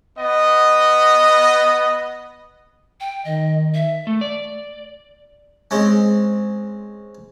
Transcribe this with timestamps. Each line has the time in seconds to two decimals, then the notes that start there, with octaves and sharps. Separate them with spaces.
0.18 B3 D#5
3.00 G5
3.25 D#3 D#5
3.74 E5
4.07 A3
4.21 D5
5.71 G#3 C4 C#4